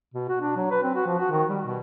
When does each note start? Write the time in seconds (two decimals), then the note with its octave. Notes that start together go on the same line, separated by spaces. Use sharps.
0.14 B2
0.29 F#4
0.42 D4
0.57 F#3
0.71 B4
0.83 C4
0.95 F#4
1.07 F3
1.19 F#4
1.31 D#3
1.50 G3
1.65 B2